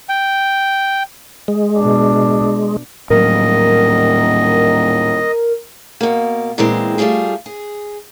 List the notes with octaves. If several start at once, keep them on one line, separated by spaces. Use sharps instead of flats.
G5
G#3
B2 D4
D#1 A2 F#3 A#4 D#5
B2 A#3
A#2 E3 G#3 C4
G3 A3 C4 F4 G#4
G#4